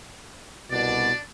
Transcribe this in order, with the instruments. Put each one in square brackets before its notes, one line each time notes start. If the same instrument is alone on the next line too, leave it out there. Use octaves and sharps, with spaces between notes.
[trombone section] C2 B2 [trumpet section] D4 D5